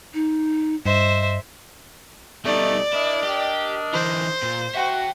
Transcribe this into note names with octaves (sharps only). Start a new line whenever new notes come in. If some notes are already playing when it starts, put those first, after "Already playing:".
D#4
G2 C5 D#5 E5
B2 G3 A3 D#4 D5
D4 E4 A#4 D#5
G4
E3 D#4 C5
A#2
F#4 E5 G5